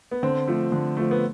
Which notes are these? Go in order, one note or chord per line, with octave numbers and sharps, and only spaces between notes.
B3
D3 C4
F3 A3
D3
F3 A3
B3